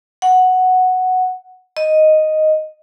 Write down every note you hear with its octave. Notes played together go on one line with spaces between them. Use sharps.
F#5
D#5